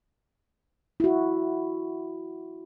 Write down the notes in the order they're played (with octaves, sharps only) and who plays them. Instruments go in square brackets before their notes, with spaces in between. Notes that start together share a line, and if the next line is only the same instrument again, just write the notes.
[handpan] E4 F#4